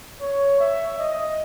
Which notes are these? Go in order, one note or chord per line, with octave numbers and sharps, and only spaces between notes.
C#5
E5
D#5